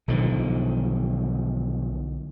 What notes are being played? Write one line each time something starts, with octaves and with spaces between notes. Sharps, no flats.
B1 D3 D#3 F3